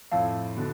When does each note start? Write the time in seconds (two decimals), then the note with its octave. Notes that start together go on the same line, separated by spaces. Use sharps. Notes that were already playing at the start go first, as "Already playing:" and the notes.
0.12 F2 A2 F5 A5 E6
0.57 B2 D3